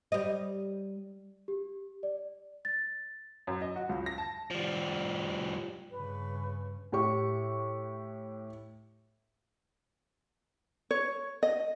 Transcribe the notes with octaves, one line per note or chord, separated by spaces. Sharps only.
G3 D#5
G4
D5
A6
F#2
D#5
F#4
C#2
A#6
A5
F3 G3
G2 C#3 B4
A2 G4 C#6
C#5
D#5